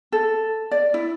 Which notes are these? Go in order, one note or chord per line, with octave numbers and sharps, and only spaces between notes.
A4
D5
E4